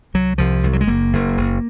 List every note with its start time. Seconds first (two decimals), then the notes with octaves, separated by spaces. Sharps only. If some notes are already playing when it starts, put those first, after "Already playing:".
0.14 C2 F#3
0.38 C2 F3
0.63 C2
0.73 F#3
0.81 G#3
0.87 F#1 A#3
1.13 F#1
1.37 F#1